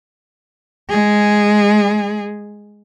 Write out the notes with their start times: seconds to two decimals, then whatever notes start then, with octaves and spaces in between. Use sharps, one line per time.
0.89 G#3 G#4